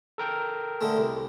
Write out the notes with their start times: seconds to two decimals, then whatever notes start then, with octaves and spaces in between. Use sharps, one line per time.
0.18 A4 A#4 G5
0.81 D3 G#3 A3
0.97 C2